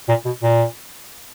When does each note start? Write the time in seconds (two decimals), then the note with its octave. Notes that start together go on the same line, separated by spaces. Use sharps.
0.08 A#2
0.25 B2
0.43 A#2